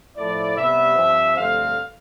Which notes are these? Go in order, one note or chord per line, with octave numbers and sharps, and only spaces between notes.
A2 F3 A3 E4 D5
C3 G3 B3 E5
G2 F3 C4
G2 D3 F3 A3 C4 F5